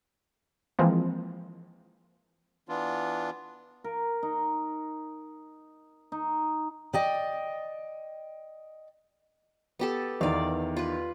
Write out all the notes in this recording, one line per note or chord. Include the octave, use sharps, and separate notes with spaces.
E3 F3 G#3 A#3 C4
E3 B3 D4 F4
A#4
D#4
D#4
D5 D#5 G5
B3 G4 A4
E2 D#3 D5 F5
F4 B4